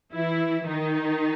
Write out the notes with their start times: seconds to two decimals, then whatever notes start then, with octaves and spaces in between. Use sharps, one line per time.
0.15 E3 E4
0.68 D#3 D#4